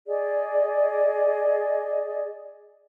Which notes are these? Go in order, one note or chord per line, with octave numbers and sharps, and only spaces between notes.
G#4 D5 D#5